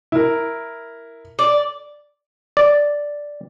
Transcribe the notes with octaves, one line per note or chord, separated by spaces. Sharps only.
E4 A#4
D5
D5